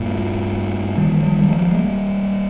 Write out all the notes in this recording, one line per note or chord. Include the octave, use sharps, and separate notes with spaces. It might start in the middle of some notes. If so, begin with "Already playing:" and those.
Already playing: G2 A#2
D#3 G3
F3
D#3 G3
G3
F3 G#3
G3 A#3